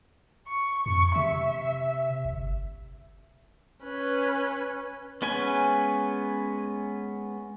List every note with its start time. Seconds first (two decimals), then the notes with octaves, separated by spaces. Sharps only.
0.47 C#6
0.86 F2 C#6
1.16 C3 E5
2.25 G1
3.85 C#4 B4
5.22 G#3 B3 C#4 B4 G#5